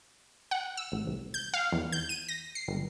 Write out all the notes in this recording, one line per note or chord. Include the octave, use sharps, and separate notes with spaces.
F#5
E6
A1
C2
G6
F5
E2
G6
D#7
A#6
C7
G1